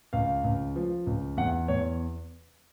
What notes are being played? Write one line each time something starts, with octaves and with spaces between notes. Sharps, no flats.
C#2 F5
C#2
F3
C#2
E2 F#5
E2 C#5